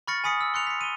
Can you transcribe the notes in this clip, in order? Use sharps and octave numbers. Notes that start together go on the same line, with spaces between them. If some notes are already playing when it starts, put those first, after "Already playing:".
B5 C#6 F6 A6 A#6 C#7
G#5 B5 D#6 B6 C#7
E6
C6 F#6 C#7 F7
B6 C#7
D#7 G7